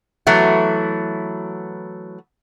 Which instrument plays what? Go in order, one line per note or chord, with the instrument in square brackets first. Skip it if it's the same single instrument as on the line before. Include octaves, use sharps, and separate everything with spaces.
[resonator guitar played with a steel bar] E3 F#3 A3 B3 F#4